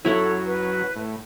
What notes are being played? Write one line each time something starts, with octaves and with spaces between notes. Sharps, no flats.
F#2 F#3 E4 A4 C#5 F#5
B4
A2